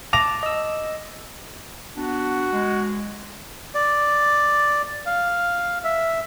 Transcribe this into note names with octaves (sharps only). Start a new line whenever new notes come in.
A5 D6 A#6 F7
D#5 E6
B3 D4 F#4
G#3
D5
F5
E5